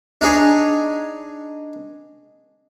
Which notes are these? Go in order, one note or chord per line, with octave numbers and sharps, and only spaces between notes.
D4 D#4 G#4 C#5